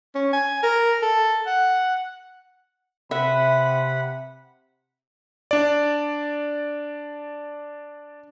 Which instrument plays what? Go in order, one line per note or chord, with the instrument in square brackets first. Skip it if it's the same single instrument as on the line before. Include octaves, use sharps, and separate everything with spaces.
[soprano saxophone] C#4
G#5
A#4
A4
F#5
[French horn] C3 [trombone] B4 [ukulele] E5 [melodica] F#5 B5
[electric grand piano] D4 D5